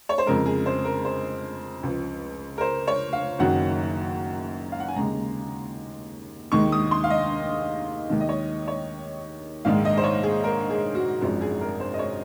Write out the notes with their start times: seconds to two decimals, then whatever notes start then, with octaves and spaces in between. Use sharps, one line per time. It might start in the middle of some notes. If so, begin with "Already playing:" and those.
0.09 C#5
0.18 C5
0.26 F2 C#3 G#3 A#4
0.46 G#4
0.66 C5
0.85 A#4
1.05 C5
1.83 C#2 C#3 F3
2.58 A#4
2.61 C5
2.87 C#5
3.13 F5
3.39 F#1 F#2 D#3 F#3 F#5
4.72 F5
4.80 F#5
4.88 G#5
4.96 D#2 C#3 G#3 A#5
6.52 D#2 D#3 G#3 C#6
6.72 D#6
6.91 C6
7.04 F5
7.10 D#5
8.09 D#2 D#3 G#3
8.20 D#5
8.29 C#5
8.68 C#5
9.65 A#1 G#2 D#3 G#3 F5
9.85 D#5
9.97 C5
10.04 C#5
10.23 G#4
10.44 A#4
10.70 G#4
10.95 F#4
11.21 G#1 F#2 F3 G#3
11.41 G#4
11.61 A#4
11.80 C5
11.94 D#5
11.99 C#5